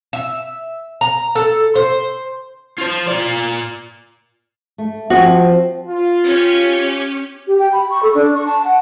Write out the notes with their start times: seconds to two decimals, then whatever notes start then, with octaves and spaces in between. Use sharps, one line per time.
0.13 E5
1.01 A#5
1.35 A4
1.75 C5
2.79 F4 C5
3.08 F4 D5
4.78 A3
5.10 F3 C4 F#4 G5
5.87 F4
6.27 C#4 G4 C#5
7.47 G4
7.59 G5
7.73 B5
7.90 C#6
8.03 A4
8.15 D4
8.35 C#6
8.47 A5
8.65 F#5